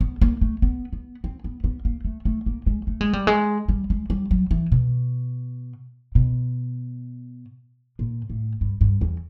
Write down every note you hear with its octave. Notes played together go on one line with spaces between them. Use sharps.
B3
A#3
A3
B3
B3
C4
B3
B3
A#3
A3
A3
A#3
G#3
A3
G#3
G3
G#3
G3
G#3
G3
F#3
E3
B2
B2
A#2
A2
G2
G2
E2